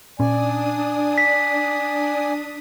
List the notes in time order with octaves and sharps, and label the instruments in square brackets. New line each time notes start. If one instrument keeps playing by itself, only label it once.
[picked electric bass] A#2 C#4 [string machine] D4 D#6 [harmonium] D5 G#5
[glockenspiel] B6